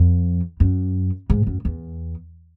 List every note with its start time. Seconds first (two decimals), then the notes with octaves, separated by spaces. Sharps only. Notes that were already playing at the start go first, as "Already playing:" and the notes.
Already playing: F2
0.60 F#2
1.30 G#2
1.47 F#2
1.65 E2